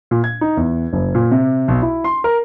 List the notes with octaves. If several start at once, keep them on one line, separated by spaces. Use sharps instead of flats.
A#2
G#6
D#4
E2
F#1
A#2
C3
B1
E4
C6
A#4